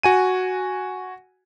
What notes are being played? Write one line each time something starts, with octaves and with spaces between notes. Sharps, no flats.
F#4 G#5 D#7